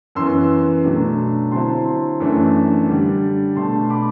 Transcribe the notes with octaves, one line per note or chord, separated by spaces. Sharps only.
F#2 E3 B3 C6 E6
B2 F#3 A3 D4
D3 F#3 C4 E4 A5 C6
F#2 E3 A3 D4
D3 G3 D4
B2 A3 D4 A5 C6
B5 D6